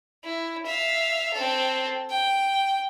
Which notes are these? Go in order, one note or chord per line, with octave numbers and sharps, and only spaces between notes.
E4
E5 F5
C4 A4
G5